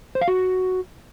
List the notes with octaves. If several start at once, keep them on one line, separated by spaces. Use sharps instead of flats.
C5
F5
F#4